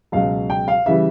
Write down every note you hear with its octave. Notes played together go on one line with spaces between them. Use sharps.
C#2 B2 F#3 F5
G5
F5
C#3 E3 G3 E5